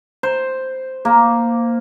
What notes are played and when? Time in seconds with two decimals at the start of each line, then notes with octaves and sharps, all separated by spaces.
0.23 C5
1.05 A#3